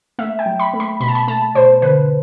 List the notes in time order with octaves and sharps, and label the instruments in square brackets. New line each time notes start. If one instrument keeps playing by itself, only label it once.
[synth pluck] A3 E5
G5
F#3
B5
A3
B5
B2 B5
A5
B5
A3 A5
B2 C5
D3 B4